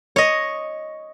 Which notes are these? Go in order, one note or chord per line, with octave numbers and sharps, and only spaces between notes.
C#5 D#5